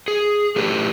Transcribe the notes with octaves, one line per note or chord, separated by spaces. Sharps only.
G#4
A3 G4 B4